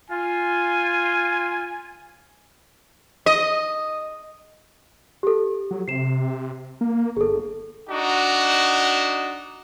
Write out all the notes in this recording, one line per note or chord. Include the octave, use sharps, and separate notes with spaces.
F4 G#5
D#5
G4 A4
F#3
C3 C7 E7
A#3
G1 G#4 A4
D4 D#4 F#4